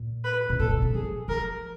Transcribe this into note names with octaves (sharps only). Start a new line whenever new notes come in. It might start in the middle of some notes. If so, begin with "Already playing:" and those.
Already playing: A#2
B4
B2
A#2 A4
B2
C3
F3 G#4
F3 A#4